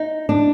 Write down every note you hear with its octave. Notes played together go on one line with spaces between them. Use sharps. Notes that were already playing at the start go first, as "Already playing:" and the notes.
Already playing: D#4
D4